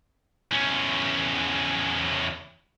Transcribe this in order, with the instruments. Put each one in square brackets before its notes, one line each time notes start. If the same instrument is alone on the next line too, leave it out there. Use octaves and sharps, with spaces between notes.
[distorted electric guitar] E2 C#4